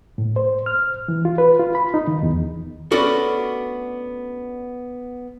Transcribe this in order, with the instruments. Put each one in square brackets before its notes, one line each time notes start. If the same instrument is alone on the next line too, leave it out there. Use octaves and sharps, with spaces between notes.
[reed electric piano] A2
C5
F6
E3
F4
B4
F4
B5
D#4
D#3
E2
[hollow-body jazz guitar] A3 B3 C#4 D4 F#4 A4